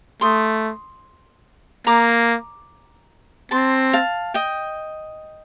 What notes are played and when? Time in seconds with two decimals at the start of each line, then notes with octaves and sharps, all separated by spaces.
0.21 A3 C6 D#6
1.87 A#3 A#5 D6
3.51 C4 A5 C6
3.93 F5 A5
4.34 D#5 G5